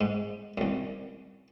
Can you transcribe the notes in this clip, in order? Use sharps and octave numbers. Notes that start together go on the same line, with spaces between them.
G#2
C2 F#2